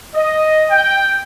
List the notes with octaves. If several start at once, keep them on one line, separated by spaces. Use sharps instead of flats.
D#5
G5